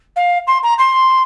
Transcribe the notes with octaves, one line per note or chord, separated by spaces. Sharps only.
F5
C6
A#5
C6